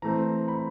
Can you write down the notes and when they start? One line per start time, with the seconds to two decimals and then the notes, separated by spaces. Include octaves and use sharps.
0.02 E3 A3 C4 A#5
0.48 B5